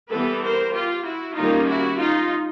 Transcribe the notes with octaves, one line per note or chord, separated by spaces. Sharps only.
E3 G3 B3 A4 B4
A#4 C5
F4 G4
E4 F#4
D#3 G3 A#3 C#4 D#4 F4
E4 F#4
D#4 F4